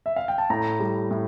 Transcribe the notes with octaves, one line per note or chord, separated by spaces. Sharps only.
E5
F5
G5
A5
A2 A#5
G3
A2